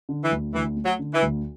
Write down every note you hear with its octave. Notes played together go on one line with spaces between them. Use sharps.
D3
E3
D2
D2 E3
A3
F#3
D3
E3
D2